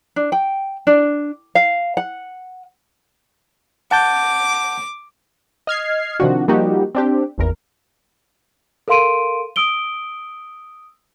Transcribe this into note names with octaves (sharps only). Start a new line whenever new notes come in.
D4
G5
D4
F5
F#5
F#5 A5 D6 G6
D#5 F6 G#6 C7
C3 D#3 F3 D4 F#4
F3 G3 A#3 D#4 F#4 G4
C4 D4 G4
G#1 E2 A#4
A4 A#4 F5 C6 D7 D#7
D#6 E6 D7 G7